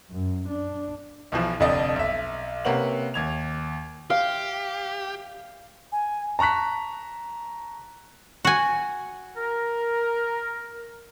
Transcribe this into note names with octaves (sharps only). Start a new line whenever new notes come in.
F#2
D4
B1 B2 E3 F3
F1 F2 D3 D5 D#5
B1 E5
C3 A#3 C#4 B4 F#5 F#7
D#2 G#6 F7
G4 F5
G#5
A5 A#5 C#6 F#6 B6
F#4 G#5
A#4